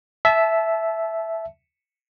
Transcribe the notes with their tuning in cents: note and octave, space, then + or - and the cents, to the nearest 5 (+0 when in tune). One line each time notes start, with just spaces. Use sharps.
E5 +0 A5 -25